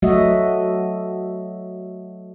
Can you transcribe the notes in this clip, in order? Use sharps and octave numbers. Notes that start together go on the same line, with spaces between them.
F#3 A3 F#4 D#5 E5